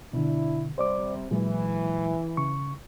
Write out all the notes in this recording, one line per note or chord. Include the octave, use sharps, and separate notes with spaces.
B2 D3 D4 E4
C3 G3 C5 D5 D6
A#2 E3 F#3 G#3
C#3 C#6